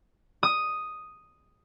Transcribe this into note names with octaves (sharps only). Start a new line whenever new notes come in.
D#6